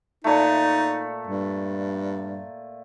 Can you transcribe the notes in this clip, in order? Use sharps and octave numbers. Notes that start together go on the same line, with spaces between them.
A#2 A3 D#4
G2